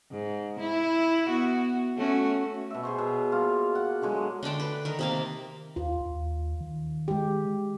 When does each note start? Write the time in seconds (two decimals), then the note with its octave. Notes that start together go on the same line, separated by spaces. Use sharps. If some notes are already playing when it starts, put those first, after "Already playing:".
0.12 G#2
0.60 E4
1.28 B3 F#4
1.97 A3 C#4 F#4
2.70 B2 E5
2.83 G#4 C5 C#5
2.98 B2
3.32 A#3 F4
3.75 F#5
4.02 D3 F#3 G#3 G#4
4.43 D3 A3 D4 G5
4.60 B4
4.85 D#3 A#4
4.99 C3 A#3 F5
5.76 D#2 F4
6.01 D#2
6.60 D#3
7.08 G#3 G4